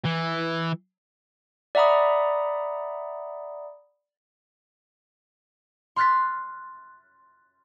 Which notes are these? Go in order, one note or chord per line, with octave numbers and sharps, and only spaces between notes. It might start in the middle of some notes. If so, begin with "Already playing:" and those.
E3
D5 E5 F#5 A#5 B5 D#6
C6 F6 F#6 A6 B6